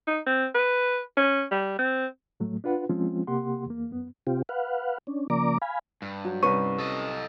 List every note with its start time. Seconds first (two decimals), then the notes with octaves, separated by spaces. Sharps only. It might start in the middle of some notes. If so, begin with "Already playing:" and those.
0.07 D#4
0.26 C4
0.55 B4
1.17 C#4
1.51 G3
1.79 C4
2.40 A2 F#3 A3
2.64 D4 F4 B4 F#5
2.89 F3 G#3 C4 C#4 F4
3.27 C3 A#3 G4 F#5 C6
3.66 E2 A#3
3.91 F#2 B3
4.27 C3 C4 F4 G4
4.49 B4 F5 F#5
5.07 C#4 D4
5.30 C#3 F3 A#3 D5 A#5 D6
5.62 F5 G#5 B5
6.02 G2
6.25 F#3
6.43 C2 C#4 B4 C#5 C#6 D#7
6.79 A4 D#5